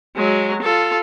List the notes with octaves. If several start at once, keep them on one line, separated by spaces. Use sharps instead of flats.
F#3 G#3
F4 A4